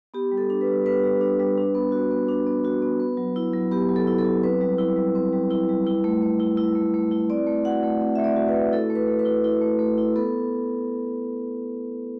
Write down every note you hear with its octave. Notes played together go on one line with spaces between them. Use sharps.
B3 G4
G3
A4
D4
B4
G3
B3 B4
G3
D4
G3
D4
B3
F#4
B3
D4
B3
F#4
B3
B3
F#3
E4
F#3
B3 G4
F#3
A4
E4
A4
F#3
C4 B4
G3
E4
G3
C4
G3
E4
G3
E4
A3
A3
E4
E4
A3
A3
E4
C4 D5
A3
F#4 F#5
A3
C4
A3 E5
D5
F#4
B4
A3
E4 A4
A3
B4
A3
B4
E4
E4
A3
A3
E4
B3 A4